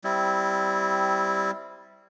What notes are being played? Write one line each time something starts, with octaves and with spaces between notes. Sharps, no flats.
G3 C4 E4